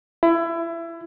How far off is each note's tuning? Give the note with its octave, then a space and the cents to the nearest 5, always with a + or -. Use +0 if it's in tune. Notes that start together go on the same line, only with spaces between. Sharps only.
E4 +25